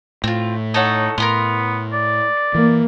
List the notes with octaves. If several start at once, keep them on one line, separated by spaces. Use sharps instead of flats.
A2 C4 F4
D#4 A4 C#5 F#5
A2 B3 A#4 A#5 C6
D5
E3 A#3